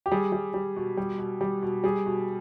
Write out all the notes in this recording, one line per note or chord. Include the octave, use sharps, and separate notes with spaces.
G4
G3 G#4
G3
G3
B2
G3
B2
G3
B2
G3 G#4
B2